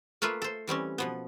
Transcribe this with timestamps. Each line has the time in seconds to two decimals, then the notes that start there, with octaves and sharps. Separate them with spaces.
0.22 A3 A#3 F4 B4 E5
0.42 A4 C5
0.67 E3 G3 C4 C#4
0.98 B2 F3 B3